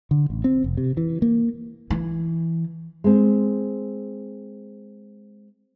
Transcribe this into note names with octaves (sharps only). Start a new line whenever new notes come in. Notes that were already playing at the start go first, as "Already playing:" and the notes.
D3
A1
C4
F1
C3
E3
A#3
E3
G#3 C4